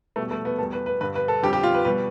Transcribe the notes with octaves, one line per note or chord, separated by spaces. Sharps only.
E2 B2 G3 A3
A3
B3
E2 B2 G3 A4
B4
B4
G2 D3 G3 B4
B4
A4
F2 D3 G3 G4
G4
F4
B4
B2 G3 B4